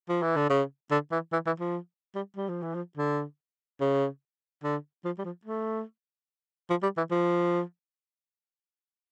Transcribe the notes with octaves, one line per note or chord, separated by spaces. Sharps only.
F3
E3
D3
C#3
D3
E3
E3
E3
F3
G3
G3
F3
E3
F3
D3
C#3
D3
F3
G3
F3
A3
F3
G3
E3
F3